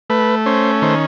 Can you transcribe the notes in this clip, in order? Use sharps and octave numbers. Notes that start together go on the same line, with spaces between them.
A3 B4
C#4 C5
D#3 C5